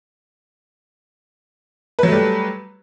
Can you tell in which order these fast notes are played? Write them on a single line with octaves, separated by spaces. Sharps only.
B4 F#3 A3 G3